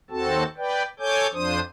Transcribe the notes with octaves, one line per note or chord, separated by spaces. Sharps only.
D#2 C4 F#4 A4 A5
B4 D5 G5
A4 C#5 G#5 D6 G6
F2 F3 D4 C5 D#6